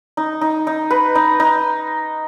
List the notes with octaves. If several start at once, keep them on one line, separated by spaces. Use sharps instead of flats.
D#4
D#4
D#4
B4
D#4
D#4